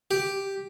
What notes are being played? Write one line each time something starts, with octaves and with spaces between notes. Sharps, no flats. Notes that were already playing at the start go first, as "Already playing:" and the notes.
G4